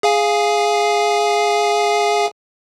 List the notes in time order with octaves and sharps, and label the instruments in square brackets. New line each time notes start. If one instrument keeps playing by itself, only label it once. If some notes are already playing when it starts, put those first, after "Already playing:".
[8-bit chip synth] G#4 F5 G#5